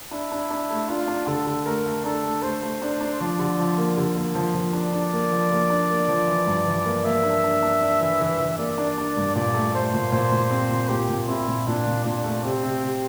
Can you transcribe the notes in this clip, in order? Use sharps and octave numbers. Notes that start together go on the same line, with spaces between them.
D4 E4
D4
D4
A3
D4 F4
D4
D3 A4
D3
A3 A#4
A3
D4 A4
A3
A3 C5
A3
D4
D4
F3 D5
D3
F3
A#3
D3
A#3
F3
F3
D4 D5
D4
A#3
F3
A#3
D4
A#3
F3
E3
G2
E3
A#3
A#3 E5
D4
D4
D4
D4
E3
E3
E3
A#3 D5
D4
D4
G2
A#2 D5
A3
A3 C5
A#2
A#2 C5
A#2
C4
A#2
A#2 G4
A#2
C4 E4
A#2
A#2 D4
A#2
A#2 D4
A3
C3 C4
C3
C3